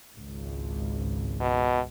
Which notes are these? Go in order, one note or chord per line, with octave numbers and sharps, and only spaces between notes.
G#1 C#2
B2